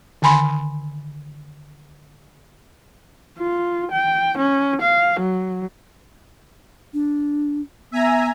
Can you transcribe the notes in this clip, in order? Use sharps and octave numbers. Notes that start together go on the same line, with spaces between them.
D3 D#3 G#5 B5 C6
F4
G5
C#4
F5
F#3
D4
B3 E5 G#5 A#5